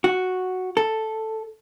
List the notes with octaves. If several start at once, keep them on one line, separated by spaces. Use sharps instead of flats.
F#4
A4